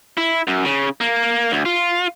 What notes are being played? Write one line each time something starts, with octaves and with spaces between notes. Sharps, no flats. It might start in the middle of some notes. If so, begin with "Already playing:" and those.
E4
F#2
C#3
A#3
D2
F4